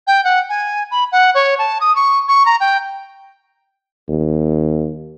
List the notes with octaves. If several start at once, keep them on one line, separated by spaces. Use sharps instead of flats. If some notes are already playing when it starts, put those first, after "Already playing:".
G5
F#5
G#5
B5
F#5
C#5
A5
D#6
C#6
C#6
A#5
G5
D#2